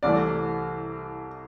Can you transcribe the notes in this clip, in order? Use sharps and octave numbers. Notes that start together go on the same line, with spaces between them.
C2 C3 E3 A3 D5